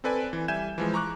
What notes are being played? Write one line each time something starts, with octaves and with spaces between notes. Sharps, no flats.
C4 A4 B4 D5 G#5
E3
G3 E5 G#5 G6 G#6 E7
E3 F3 G#3
A#5 C#6 D6 F#6